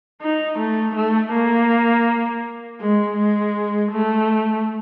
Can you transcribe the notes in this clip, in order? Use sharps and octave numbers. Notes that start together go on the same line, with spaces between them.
D#4
A3
A3
A#3
G#3
G#3
A3